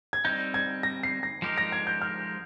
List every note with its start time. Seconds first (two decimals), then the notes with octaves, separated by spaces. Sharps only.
0.13 G#6
0.25 G3 C4 D#4 G6
0.54 G#6
0.83 A#6
1.03 C7
1.23 A#6
1.42 F3 G#3 D#4 G4 A#4
1.58 A#6
1.72 G#6
1.87 G6
2.01 F6